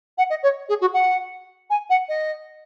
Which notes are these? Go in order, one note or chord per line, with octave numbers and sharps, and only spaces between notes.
F#5
D#5
C#5
G#4
F#4
F#5
G#5
F#5
D#5